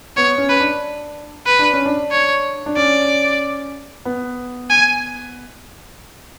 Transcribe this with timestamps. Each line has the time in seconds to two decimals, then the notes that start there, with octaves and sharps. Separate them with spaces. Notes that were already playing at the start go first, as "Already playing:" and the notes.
0.17 B3 C#5
0.38 C#4
0.49 B4
0.60 D4
1.46 B4
1.59 D4
1.73 C#4
1.86 D4
2.11 C#5
2.66 D4
2.77 C#4 D5
4.05 B3
4.70 G#5